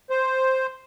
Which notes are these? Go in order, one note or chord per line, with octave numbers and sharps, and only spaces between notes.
C5